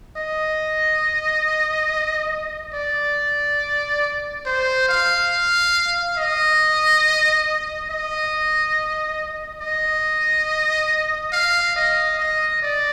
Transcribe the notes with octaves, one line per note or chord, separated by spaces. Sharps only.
D#5
D5
C5
F5
D#5
D#5
D#5
F5
D#5
D#5
D5